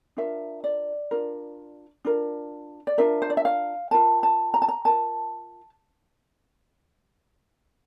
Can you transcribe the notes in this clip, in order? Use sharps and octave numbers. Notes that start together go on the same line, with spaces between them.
D4 F4 A#4 E5
D5
D4 F4 A#4
D4 F4 A#4
D5
D4 F4 A#4 E5
C5
D5
E5
F5
F4 A#4 A5
A5
A#5
A5
A#5
F4 A#4 A5